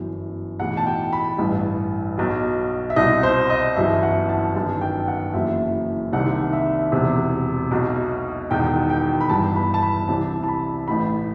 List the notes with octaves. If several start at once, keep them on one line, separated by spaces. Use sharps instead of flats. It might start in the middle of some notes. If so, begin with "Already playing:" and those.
Already playing: G1 F#2 E3
B1 A2 E3 F#5
A5
G5
B5
A1 G2 E3
B1 B2
E5
C2 B2 D#5
C5
D#5
G1 F#2 E3 E5
F#5
A5
G1 F#2 D#3 A5
G5
F#5
F#1 F#2 E3 E5
C2 C3 D#3 F#5
E5
E1 E2 C3
B1 B2
E1 E2 D#3 G5
G5
B5
G1 G2 E3 A5
B5
A5
B5
C2 C3 E3 A5
A5
B5
A1 A2 E3 B5